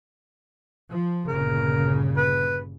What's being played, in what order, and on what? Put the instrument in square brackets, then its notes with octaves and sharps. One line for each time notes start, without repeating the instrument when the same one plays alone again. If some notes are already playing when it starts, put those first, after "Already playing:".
[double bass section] F3
[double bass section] G1 A#2 C#3 [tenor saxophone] A#4
[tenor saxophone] B4